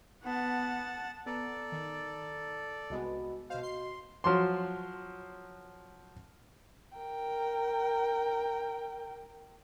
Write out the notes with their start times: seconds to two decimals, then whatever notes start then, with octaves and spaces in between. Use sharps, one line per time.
0.24 B3 F#5 A5
1.26 B3 A4 D5 A#5
1.72 D#3
2.90 C2 G#3 B3 F#4 D#5 B5
3.50 B2 F#4 C5 D#5 F5
3.63 C6 C7
4.24 F3 F#3 C6
6.98 A#4 G5